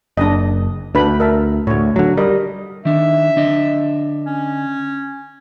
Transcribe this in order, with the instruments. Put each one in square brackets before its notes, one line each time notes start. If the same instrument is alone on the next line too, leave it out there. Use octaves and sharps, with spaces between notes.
[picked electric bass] F#1 [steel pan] D4 D#5
[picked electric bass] D2 [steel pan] D4 B4 B5
[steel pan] A#4 E5 A5
[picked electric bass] D2 A2 [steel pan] C#5
[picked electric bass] D3 F#3
[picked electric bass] G3 [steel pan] A#4 D#5
[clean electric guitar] D#3 D4 [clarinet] E5
[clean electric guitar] D3 D4 D#5
[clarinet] C#4